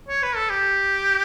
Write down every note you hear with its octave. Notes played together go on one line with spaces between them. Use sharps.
C#5
B4
A4
G4